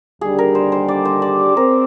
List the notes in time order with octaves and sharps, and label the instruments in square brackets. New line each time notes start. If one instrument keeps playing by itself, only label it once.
[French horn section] D#2 D3 G3 D4 G4 [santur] G#4
[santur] A#4
C5
C5
D5
C5
D5
[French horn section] C4 [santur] A#4